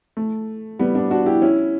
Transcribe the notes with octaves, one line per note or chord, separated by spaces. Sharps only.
A3
G3 B3
B3 D4
D4 F#4
E4 G4
C#4 E4